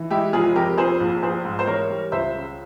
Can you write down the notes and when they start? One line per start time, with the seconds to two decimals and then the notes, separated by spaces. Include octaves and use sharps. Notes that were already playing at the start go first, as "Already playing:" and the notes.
Already playing: E3
0.10 G#3 E4 G4
0.33 F1 F4 G#4
0.55 F2 G4 A#4
0.77 F3 G#4 C5
1.00 A#1
1.23 A#1 G#4 C5
1.45 G#2
1.59 C5
1.67 E3 A#4 C#5
1.90 G3
2.12 C#2 C5 E5
2.35 C#3